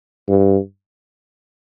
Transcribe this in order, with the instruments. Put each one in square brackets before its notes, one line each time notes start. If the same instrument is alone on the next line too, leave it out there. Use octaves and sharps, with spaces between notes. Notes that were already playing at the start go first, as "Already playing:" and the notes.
[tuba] G2